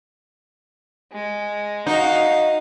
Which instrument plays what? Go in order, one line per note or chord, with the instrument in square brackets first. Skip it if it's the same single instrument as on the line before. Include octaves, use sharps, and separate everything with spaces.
[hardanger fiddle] G#3
[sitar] D#4 [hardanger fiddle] F#4 F5